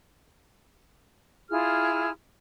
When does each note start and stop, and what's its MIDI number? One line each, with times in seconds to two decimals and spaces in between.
1.50 2.10 64
1.50 2.10 65
1.50 2.10 68
1.50 2.10 89